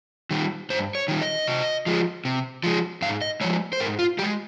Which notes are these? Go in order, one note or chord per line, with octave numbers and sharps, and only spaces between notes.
D#3 G3
G2 C5
C#5
D#3 G3
D#5
C3
F3 G#3
C3
F3 G#3
G#2 F5
D#5
F3 G#3 C#5
C5
G#2 A#4
F4
F3 G4
G#3